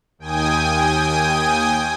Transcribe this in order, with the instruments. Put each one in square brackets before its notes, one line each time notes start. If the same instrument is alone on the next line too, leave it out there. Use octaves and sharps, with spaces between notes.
[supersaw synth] D#2 G5 G#5 D#6